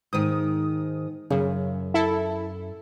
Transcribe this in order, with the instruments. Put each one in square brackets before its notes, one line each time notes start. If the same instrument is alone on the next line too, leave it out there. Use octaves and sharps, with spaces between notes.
[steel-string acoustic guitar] G#2 D#3 [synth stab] D#6
[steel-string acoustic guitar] F#2 [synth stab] C#3
[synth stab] E4 A4